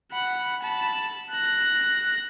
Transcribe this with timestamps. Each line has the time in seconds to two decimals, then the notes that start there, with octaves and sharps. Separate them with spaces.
0.12 F#5 B5
0.63 A5 B5
1.31 F#6 A#6